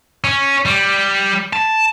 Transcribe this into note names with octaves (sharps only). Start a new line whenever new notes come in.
C#4
G3
A5